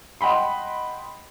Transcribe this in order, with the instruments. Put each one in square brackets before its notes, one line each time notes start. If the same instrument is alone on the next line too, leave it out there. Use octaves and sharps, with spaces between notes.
[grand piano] D#5 F#5 G5 B5 C6